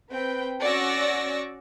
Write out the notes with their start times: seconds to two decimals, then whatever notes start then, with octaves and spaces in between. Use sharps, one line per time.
0.12 C4 B4 G5
0.62 C#4 F#4 D5 C#6 E6 A#6